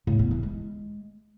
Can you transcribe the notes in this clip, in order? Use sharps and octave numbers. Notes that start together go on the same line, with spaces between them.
A2
B3
E3
G#3